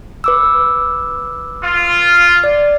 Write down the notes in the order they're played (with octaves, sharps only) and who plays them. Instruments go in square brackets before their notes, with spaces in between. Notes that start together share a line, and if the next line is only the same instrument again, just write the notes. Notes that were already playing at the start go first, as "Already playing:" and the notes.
[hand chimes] B4 D6 E6
[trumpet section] F4
[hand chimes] D5